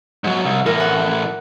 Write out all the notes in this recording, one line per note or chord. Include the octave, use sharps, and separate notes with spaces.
G#2 F#3
C2
A2 E3 A#4
F#5